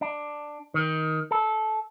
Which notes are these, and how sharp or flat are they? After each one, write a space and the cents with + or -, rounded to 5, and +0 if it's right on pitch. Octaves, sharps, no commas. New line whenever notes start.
D4 +10
D#3 +15
A4 -15